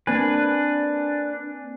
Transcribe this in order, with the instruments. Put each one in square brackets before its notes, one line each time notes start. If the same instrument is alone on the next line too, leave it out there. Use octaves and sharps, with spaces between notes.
[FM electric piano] A#3 C4 G#5 [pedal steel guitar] D4 B4